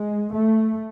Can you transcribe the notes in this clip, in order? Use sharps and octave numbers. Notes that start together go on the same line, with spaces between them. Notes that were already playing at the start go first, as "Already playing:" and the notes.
Already playing: G#3
A3